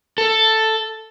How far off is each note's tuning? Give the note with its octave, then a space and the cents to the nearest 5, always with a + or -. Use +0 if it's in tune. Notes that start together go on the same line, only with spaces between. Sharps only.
A4 +5